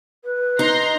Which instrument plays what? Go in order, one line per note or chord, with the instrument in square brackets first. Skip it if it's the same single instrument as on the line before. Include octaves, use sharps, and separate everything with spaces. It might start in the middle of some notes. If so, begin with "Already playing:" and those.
[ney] B4
[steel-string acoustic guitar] D#4 [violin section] A#5 C6